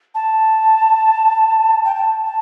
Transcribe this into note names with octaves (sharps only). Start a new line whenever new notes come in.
A5
G5
A5
A5